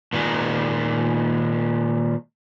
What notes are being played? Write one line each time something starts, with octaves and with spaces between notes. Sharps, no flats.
A#2 D#3 G#3